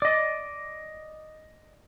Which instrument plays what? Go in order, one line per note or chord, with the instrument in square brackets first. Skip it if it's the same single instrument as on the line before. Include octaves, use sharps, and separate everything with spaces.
[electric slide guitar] D5 D#5